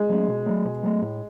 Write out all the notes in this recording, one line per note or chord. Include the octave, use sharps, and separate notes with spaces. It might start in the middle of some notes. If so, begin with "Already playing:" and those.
Already playing: G#3
F#3 A3 C#4
B2
F#3 A3
B2
F#3 A3
A2